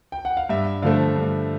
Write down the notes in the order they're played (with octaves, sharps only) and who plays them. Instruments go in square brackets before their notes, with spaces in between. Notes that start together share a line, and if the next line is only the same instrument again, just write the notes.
[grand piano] G5
F#5
F5
G2 E5
D3 F3 A3 F5
G2